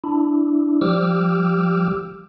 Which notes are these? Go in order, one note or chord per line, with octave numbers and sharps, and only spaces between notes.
D4 E4
F3 G3 G4 D6 E6 F6